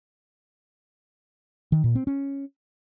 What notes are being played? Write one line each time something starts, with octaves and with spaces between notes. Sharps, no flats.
D#3
A#2
C4
C#4